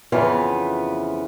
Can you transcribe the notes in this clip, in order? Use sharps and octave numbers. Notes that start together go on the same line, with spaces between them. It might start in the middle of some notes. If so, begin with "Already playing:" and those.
F2 C#3 E3 B3 F4